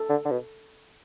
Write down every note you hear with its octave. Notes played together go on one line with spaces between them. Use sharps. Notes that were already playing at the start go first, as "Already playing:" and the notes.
Already playing: A4
D3
D3
B2